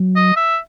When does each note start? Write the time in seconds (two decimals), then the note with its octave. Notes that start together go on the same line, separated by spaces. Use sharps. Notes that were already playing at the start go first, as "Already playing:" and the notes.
Already playing: F#3
0.16 D#5
0.36 E5